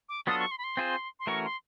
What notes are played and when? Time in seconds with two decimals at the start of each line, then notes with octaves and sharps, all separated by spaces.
0.09 D6
0.26 F#3 B3 D4 F4 A4 D#6
0.39 C#6
0.51 C6
0.58 B5
0.64 C6
0.77 C4 F4 G#4 C5
1.20 C6
1.27 E3 A3 C#4 F#4 A#4 C#6
1.45 C6